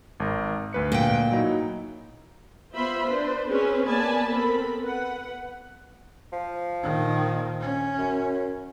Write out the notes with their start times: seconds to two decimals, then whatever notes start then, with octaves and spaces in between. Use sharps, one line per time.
0.20 G#1 A#4
0.73 D2 B4 C#7
0.92 A#2 G5
1.31 F#3 D#4 E4
2.72 B3 F4 C5 E5 B5 C6
3.05 D4 B4 C5
3.48 C4 C#4 G#4 B4 C5
3.86 A#3 B3 D5 G#5 A5 B5
4.29 B3 C4 A4 A#4 B5
4.82 B4 F#5
6.33 F3
6.83 A#2 D#3
7.61 C#4
7.98 F#2